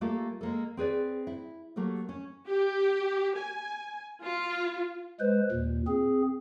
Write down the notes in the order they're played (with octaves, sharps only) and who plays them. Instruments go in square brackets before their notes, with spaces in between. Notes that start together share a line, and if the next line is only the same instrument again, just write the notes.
[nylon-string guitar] G3 A3 A#3 F4 A4 F5
G#3 A#3 A4
C4 G#4 B4 D5
E4
F#3 A3 A#3 G4 A4
C#4
[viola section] G4
G#5
F4
[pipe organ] G#3 B4 C5
D#2 A#2
C4 G#4